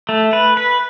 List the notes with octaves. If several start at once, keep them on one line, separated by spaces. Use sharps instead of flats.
A3
B4
B4